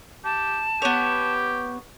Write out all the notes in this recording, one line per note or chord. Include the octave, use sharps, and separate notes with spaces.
G4 A5
B3 G4 C#5